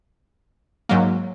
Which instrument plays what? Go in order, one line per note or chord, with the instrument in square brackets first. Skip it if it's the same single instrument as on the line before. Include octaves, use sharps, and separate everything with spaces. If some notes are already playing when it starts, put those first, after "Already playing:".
[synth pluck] G#2 F#3 A#3